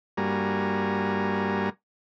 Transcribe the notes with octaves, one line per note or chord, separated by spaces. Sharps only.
G2 G3 A#3 F#4 G#5 A#5